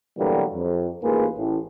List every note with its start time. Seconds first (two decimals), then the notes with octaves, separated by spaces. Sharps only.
0.18 B2 D3 E3 F#3 G3 A#3
0.53 F2
1.02 A1 G#2 A#3 F4 G#4 B4
1.37 A1 A2